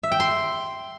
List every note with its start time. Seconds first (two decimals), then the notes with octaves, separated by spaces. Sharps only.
0.03 E5
0.12 G5
0.20 C6